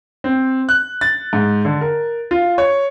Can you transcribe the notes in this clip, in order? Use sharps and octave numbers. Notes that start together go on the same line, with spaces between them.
C4
F#6
A6
G#2
D3
A#4
F4
C#5